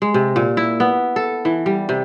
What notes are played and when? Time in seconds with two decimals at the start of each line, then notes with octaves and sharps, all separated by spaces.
0.02 G#3
0.14 C3
0.36 A#2
0.57 E4
0.80 B3
1.16 A4
1.45 E3
1.66 G3
1.89 C3